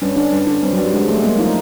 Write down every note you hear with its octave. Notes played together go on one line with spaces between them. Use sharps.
G2 C#4
D3 D4
G2
D3
G2 C4
F#3
G2
G3
D3 G#3
D3 A3
G#3 A#3
F3 D#4